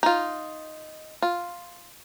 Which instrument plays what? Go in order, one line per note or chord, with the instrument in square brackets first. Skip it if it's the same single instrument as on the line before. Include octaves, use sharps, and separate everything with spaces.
[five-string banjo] D#4 F4
F4